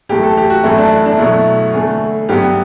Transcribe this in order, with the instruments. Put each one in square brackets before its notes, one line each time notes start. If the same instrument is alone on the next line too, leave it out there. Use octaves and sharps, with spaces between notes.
[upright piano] F#2 E3 A3 G4
A4
G4
F#4
F#2 E3 A3 E4
D4
E4
D4
B2 F#3 A3 E4
E2 D3 A3
G2 F#3 B3 G4